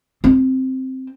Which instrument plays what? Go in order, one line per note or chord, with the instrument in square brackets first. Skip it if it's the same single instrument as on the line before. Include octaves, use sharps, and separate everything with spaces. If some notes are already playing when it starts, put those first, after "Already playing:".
[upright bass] C4